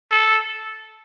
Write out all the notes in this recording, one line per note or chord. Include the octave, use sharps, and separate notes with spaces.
A4